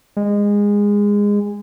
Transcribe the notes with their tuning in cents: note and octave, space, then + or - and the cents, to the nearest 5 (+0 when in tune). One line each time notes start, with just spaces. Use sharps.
G#3 -20